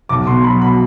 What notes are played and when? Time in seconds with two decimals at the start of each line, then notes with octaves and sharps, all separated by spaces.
0.09 B1 D6
0.27 B2 C6
0.44 F#3 B5
0.61 B2 B5